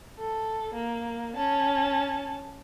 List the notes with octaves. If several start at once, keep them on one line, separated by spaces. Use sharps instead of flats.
A4
A#3
C#4 A5